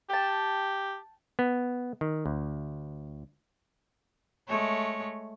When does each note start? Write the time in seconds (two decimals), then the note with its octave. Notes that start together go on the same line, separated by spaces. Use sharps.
0.10 G4 G5 A5
1.39 B3
2.01 D#3
2.26 D2
4.48 G#3 A3 C#5